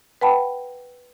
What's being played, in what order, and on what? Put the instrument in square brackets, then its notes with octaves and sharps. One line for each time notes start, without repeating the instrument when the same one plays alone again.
[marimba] B4 F#5 G5 A5 B5